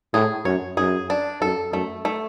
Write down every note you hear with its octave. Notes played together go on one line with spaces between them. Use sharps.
A2 G#4
F#2 C#5
F#2 G#4
D4
F#2 A4
F#2 A3
A3